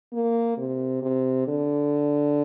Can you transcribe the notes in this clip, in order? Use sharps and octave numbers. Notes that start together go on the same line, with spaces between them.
A#3
C3
C3
D3